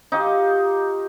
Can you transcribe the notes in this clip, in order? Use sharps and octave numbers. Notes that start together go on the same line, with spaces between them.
D#4 F4 G4 D#5